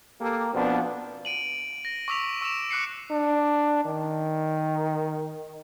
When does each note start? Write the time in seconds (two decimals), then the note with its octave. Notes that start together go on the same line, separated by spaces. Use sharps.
0.20 A#3 G4 A4
0.53 B2 F3 B3 C4 D4
1.25 D7 D#7 F#7
1.85 A#6
2.08 C#6 D6 E6 B6 F7
2.41 C#6 E6 D7 E7 F7
2.70 D6 F#6 C7 C#7
3.11 D4
3.85 D#3